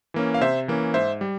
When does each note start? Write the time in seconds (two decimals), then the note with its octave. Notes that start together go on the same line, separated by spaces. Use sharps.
0.14 E3 A#3 C#4
0.34 F5
0.41 C3 C5 E5
0.68 E3 A#3 C#4
0.94 G#2 C5 E5
1.21 G3